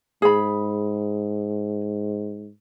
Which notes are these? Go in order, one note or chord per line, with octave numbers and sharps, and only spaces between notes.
G#2 G#4 B5